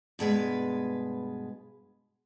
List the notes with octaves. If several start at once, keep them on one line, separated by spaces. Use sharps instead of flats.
G2 B2 G#3 B4